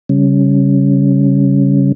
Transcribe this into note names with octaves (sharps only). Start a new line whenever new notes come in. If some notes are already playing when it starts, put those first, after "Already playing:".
C#3 G3 C#4